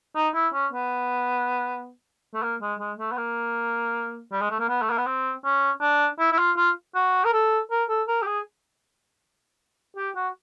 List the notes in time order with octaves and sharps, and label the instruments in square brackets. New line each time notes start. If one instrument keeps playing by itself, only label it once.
[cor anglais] D#4
E4
C#4
B3
A3
A#3
G#3
G#3
A3
B3
A#3
G3
G#3
A3
A#3
B3
A3
A#3
B3
C4
C#4
D4
E4
E4
F4
F4
F#4
A#4
A4
A#4
A4
A#4
G4
G#4
G4
F#4